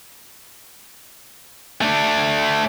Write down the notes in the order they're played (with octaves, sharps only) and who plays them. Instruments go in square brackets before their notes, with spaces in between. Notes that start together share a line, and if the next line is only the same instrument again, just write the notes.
[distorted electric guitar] A3 D4